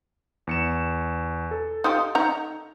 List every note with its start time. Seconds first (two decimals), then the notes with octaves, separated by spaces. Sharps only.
0.47 E2 C#7 E7
1.51 A4
1.84 D#4 F4 G4
2.15 D#4 A#5